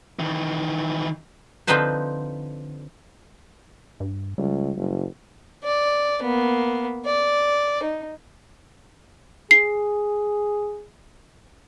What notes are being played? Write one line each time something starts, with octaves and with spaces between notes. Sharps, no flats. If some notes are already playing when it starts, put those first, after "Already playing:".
D#3 E3
D3 F3 C4 D#4 B4 C5
G2
C#2 G3
F#1
D5
A#3 B3
D5
D#4
G#4 C7